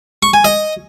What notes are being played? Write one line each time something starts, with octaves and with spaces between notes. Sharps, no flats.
C#6
G#5
D#5